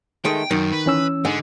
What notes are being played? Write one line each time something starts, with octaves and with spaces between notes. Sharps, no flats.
D#3 G#3 A3 G5
F#2 D#3
B4
E3 C#4 E6
G#2 D3